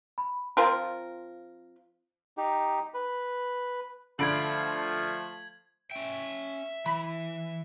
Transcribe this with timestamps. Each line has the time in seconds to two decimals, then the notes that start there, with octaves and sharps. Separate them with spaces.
0.18 B5
0.57 F3 C4 F4 A#4
2.37 D#4 G4
2.94 B4
4.19 D3 F3 A3 B5 G#6 D7 F#7
5.91 C#4 E5 G5
6.86 E3 B5